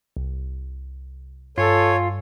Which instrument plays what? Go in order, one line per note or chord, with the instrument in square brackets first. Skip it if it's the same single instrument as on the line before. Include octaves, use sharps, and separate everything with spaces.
[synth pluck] C2
[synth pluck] G2 G#5 [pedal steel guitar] F4 [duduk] A4 [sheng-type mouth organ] C#5